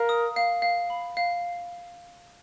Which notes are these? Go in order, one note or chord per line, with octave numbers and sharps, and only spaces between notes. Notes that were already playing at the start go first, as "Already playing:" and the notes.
Already playing: A#4 F5
D#6
F5
F5
B5
F5